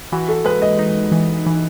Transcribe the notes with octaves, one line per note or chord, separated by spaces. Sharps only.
E3 F#4
A4
G#3 B4
D#5
D#4
E3
E3